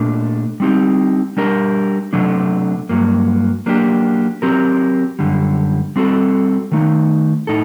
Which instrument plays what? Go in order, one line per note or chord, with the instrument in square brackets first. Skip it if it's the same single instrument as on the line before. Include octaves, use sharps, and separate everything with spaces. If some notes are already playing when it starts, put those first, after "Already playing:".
Already playing: [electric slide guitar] A#2 A3 D4
G3 C4 D#4 G4
G3 D4 G4 A#4
C3 F#3 A3 D4
G2 F#3 A#3
F#3 A#3 D4 G4
F#3 C4 G4 A#4
F#2 D3 G3
G3 C4 F#4 A4
D#3 A3 D#4
A2 D#4 A4